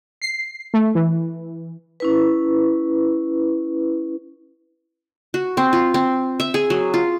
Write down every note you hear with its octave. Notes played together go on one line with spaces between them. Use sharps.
C7
A3
E3
C#4 E4 B4
F#4
C4
F4
C4
E5
G#4
F#3
F4